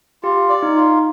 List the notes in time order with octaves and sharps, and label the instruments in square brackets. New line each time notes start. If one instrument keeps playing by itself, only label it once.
[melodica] F4 [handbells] G4
[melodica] D5
[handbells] D#4
[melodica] F4